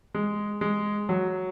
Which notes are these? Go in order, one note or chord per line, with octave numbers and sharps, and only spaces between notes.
G#3
G#3
F#3